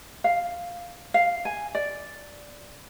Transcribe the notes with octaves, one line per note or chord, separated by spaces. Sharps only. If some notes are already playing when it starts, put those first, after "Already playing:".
F5
F5
G#5
D5